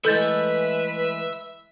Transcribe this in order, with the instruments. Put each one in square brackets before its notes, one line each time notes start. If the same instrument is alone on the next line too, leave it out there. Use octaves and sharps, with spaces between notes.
[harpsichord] E3 G#3 A3 [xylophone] A4 G6 A6 [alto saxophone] B4 [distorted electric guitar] E5